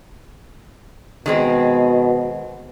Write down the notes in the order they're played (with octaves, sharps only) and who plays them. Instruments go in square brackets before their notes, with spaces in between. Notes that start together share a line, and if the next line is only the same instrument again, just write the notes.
[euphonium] B2 [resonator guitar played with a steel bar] D#3 G#3 C4